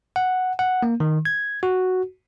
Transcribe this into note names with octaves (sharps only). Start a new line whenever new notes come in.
F#5
F#5
A#3
D#3
G#6
F#4